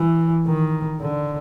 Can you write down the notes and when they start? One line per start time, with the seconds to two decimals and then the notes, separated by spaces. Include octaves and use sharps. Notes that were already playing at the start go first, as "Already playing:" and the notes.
Already playing: E3
0.47 D#3
1.00 D3